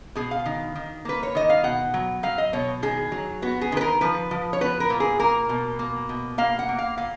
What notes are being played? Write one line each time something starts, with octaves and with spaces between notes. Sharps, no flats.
B2 G#4
F5
D#3
D#3
A#3 B4
C#5
D#3 D#5
F5
B2 F#5
F#3
F#3 F5
D#5
B2 C#5
D#3 G#4
F#3
B3 F#4
G#4
D#3 B4
A#4
F3 B4
F3
C#5
B3 B4
A#4
A#2
G#4
A#3 A#4
B2
A#3
B2
A#3 F5
F#5
A#3
F5
A#2 F5